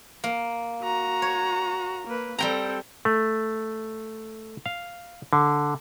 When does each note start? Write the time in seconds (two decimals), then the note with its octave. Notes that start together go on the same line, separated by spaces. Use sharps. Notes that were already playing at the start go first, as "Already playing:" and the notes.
0.24 A#3
0.82 F#4 A#5
1.22 C#5
2.07 A#3 B4
2.39 G3 C4 A4 G5 A#5
3.05 A3
4.66 F5
5.33 D3